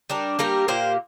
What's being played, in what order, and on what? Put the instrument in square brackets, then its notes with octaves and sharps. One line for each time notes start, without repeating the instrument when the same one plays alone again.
[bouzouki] G3 D4 A#4
G3 A#3 G4 A#4
A#2 A#3 G4 C5